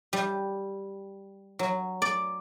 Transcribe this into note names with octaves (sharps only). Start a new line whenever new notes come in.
G3
F#3
D5